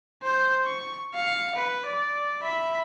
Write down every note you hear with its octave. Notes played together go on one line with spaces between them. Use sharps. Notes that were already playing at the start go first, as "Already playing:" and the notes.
C5 G6
C#6
F5 C#7
B4
D5
E5 B5